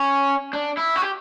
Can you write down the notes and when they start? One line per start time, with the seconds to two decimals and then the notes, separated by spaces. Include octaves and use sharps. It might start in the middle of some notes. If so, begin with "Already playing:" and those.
Already playing: C#4
0.53 D4
0.77 E4
0.96 F#4
1.02 G4